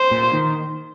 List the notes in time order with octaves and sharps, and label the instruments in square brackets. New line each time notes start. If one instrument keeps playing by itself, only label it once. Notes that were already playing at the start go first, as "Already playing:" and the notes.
Already playing: [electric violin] C5
[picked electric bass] A#2
D#3